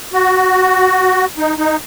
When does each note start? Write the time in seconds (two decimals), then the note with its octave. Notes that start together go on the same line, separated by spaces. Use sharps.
0.13 F#4
1.38 D#4
1.58 D#4